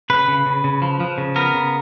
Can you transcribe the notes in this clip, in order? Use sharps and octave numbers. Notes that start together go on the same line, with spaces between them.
C#3 B4
C#3
C#3
C#3
F3
F3
C#3
B3 A#4
C#3